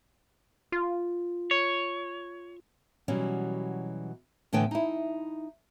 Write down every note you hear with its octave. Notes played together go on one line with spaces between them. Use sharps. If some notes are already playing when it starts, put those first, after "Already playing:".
F4
C#5
B2 E3 F#3 G3 C#4
A2 D3 E3 B3 G5 G#5
D#4 E4